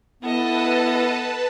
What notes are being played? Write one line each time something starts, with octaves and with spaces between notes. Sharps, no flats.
B3 E4 A4 B4 D#5 A5